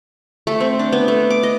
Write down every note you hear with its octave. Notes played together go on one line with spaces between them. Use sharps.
A3
C4
D4
B3
A3
D6
D#5